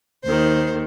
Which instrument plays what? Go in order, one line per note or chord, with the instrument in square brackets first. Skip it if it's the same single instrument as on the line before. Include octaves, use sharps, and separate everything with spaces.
[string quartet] D#2 D#3 C5